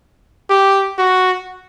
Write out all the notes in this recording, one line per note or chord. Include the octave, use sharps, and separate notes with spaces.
G4
F#4